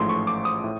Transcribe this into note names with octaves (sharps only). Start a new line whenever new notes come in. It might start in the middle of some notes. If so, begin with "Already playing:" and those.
Already playing: A1 G#2 F3 A3 C6
C#6
D6
D#6
A2